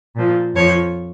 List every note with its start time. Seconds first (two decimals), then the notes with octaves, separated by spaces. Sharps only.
0.16 A#2 F3
0.54 F2 F3 C#5